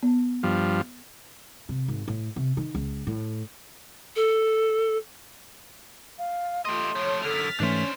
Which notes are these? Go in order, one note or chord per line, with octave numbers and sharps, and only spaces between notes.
B3
G2 F3
C3
G#1
A2
C3
D#3
C#2
A2
A4
F5
A3 F4 G4 D#5 C6
F3 A3 C#5
F#2 D3 A4 F6 A6 B6
G#2 E3 A3 C#4 D4 C5